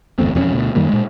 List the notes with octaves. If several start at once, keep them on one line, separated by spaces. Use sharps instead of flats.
G1 E2 A3 C4
E1 F2 F3 C#4
D2 B2
F#2 D#3 G3 A#3
A#2 G#3